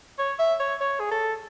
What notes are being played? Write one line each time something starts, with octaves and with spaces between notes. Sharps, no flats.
C#5
E5
C#5
C#5
G#4
A4